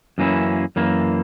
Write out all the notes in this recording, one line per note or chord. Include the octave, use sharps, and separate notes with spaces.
F#2 E3 A#3 C#4 E4
F#2 E3 A#3